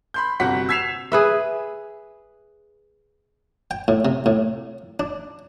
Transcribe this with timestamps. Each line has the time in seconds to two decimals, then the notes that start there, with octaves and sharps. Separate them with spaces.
0.14 B5 C6 G6
0.40 G1 C3 F#4 F#5 B6
0.69 E6 G#6 B6 C7 E7 F7
1.12 G#4 B4 E5
3.71 G5
3.88 A2
4.05 C3
4.26 A2
5.00 D4